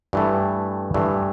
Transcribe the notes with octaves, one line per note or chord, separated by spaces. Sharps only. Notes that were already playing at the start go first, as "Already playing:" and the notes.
G2 E3 A3
G2 E3 A3